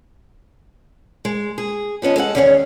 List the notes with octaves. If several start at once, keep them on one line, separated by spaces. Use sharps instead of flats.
G#3
G#4
F3 B3 C#4 D#5
G#3 A4 F5 F#5
E2 D#3 C#4 G#4 C5 C#5